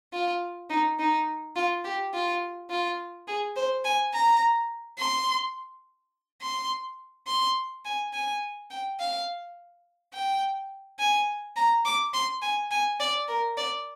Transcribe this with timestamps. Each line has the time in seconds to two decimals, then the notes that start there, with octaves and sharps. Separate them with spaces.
0.13 F4
0.70 D#4
0.99 D#4
1.56 F4
1.84 G4
2.14 F4
2.70 F4
3.28 G#4
3.56 C5
3.85 G#5
4.14 A#5
4.99 C6
6.41 C6
7.27 C6
7.85 G#5
8.13 G#5
8.70 G5
9.00 F5
10.14 G5
10.99 G#5
11.56 A#5
11.85 D6
12.14 C6
12.42 G#5
12.71 G#5
13.00 D5
13.28 A#4
13.57 D5